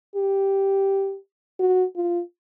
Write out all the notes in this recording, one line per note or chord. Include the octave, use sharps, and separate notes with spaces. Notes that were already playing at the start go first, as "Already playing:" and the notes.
G4
F#4
F4